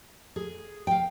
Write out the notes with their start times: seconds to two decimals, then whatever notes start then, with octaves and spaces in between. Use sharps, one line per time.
0.36 G#4
0.87 F5 G5